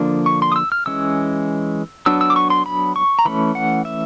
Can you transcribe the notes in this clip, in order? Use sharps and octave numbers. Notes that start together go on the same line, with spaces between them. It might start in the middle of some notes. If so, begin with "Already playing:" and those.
Already playing: D3 F3 A#3 D4
C#6
C6
D#6
E6
F6
E3 G#3 C#4 E6
F#3 B3 D4 E6
E6
D6
C#6
C6
B5
C#6
A#5
E3 A3 C#4 B5
F#5
E5